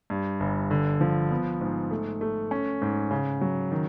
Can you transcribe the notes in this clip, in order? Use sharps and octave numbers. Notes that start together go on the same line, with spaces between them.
G2
G1
D3
F3
B3
G#2
A3
A3
C#4
G#2
C#3
F#3
D#3